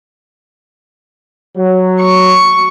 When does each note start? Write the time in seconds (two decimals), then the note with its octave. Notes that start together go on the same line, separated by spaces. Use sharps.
1.55 F#3
2.00 C#6